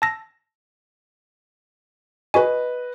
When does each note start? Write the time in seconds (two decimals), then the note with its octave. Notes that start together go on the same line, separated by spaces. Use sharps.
0.02 A5 E6 A#6
2.34 F#4 B4 D#5 G#5